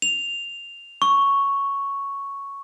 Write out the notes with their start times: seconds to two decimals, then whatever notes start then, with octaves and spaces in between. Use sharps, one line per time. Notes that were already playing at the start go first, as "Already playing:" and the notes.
0.02 F7
1.02 C#6